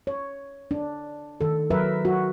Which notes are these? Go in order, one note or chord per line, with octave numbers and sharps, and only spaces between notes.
C#5
D4
D#3 A4
F#3 A#4 B4 E5
F#4